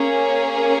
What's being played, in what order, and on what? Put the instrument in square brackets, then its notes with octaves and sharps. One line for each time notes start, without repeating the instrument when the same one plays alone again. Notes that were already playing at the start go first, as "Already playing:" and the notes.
Already playing: [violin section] A#3 C#4 G#4